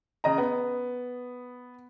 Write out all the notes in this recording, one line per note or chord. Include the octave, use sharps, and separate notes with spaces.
C#3 D#5 A#5
B3